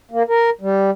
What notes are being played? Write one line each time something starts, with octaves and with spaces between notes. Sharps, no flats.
A#3
A#4
G3